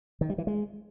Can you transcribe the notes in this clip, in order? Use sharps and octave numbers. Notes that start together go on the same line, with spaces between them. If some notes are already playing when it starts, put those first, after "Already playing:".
D#3
G3
E3
G#3